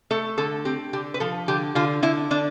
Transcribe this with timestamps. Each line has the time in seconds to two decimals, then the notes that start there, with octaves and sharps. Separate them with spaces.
0.10 A3 A4
0.38 D3 A4
0.65 C4 G4
0.93 D3 G4
1.14 B4
1.20 F3 A4
1.48 D3 G4
1.75 D3 F4
2.03 D3 E4
2.31 D3 D4